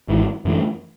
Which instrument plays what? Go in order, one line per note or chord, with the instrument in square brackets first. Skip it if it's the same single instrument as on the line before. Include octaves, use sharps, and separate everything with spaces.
[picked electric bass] G#1 G#2 E3
F#2 E3 A3